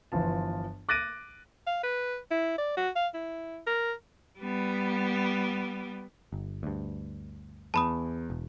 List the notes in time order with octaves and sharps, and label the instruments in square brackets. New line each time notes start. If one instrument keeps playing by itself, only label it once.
[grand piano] G1 E3 F3 A5
D6 F#6 A6 A#6 D7 D#7
[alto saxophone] F5
B4
E4
D5
F#4
F5
E4
A#4
[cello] G3 B3
[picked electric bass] G1
D2 G2
[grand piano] E2 [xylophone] A5 B5 D#6
[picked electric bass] E1